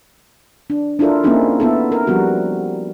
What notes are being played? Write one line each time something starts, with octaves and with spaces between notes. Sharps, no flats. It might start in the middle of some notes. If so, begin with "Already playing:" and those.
D4
D4 E4 F4 A4 A#4
A#3 C4 C#4 D#4 E4 G#4
B3 E4 A4
A#4
F3 G3 B3 F#4